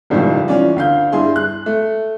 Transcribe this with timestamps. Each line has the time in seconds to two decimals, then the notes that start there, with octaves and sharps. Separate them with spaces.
0.10 G#1 C#2 A2 D#3 F3 G3
0.48 E3 C#4 F4 D5
0.76 D2 F5 G6
1.12 G2 E4 G#4 C6
1.36 F#6
1.66 A3